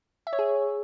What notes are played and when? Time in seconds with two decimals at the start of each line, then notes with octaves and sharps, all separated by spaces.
0.27 E5
0.33 C#5
0.39 G#4